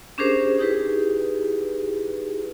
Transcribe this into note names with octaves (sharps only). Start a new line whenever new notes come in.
C#4 D4 G4 G#4 A#4 C5
D#4 E4 G4 G#4 B4